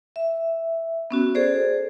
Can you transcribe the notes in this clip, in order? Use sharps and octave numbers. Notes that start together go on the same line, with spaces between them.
E5
B3 C#4 F#4
G#4 A4 C5 D5